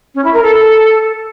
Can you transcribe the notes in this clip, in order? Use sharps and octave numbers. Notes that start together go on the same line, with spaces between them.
C#4
E4
A#4
A4